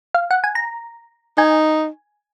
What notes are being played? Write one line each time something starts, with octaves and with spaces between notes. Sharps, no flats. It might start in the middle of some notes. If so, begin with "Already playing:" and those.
F5
F#5
G#5
A#5
D#4 G#5